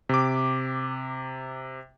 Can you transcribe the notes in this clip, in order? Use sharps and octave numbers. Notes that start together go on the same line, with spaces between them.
C3 D6